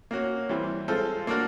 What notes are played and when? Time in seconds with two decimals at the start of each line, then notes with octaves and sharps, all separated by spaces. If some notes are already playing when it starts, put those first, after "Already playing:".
0.11 A#3 C#4 F#4
0.49 E3 G3 C4
0.88 G#3 C4 F4 A4 C5
1.27 A#3 D4 F#4 A#4